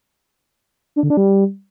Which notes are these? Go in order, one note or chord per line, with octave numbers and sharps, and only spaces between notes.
D4
D3
D4
G3